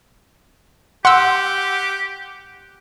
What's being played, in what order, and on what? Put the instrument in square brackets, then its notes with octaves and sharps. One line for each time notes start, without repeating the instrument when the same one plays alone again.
[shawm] G4 [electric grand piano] F#5 [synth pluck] C6 E6